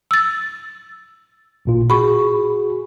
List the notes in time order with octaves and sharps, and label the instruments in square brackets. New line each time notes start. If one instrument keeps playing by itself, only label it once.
[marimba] E6 A6
[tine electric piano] A1 A#2 F4
[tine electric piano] F#4 G#4 [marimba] B5 C#6